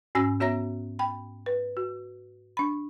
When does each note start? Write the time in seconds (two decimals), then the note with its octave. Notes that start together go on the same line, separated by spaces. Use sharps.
0.15 G#2 C#4 F#4 G#5 E6 A#6
0.40 B3 F#4 C#5 E5 A#5 A#6
0.99 G5 B5
1.46 B4
1.77 F#4
2.57 D4 B5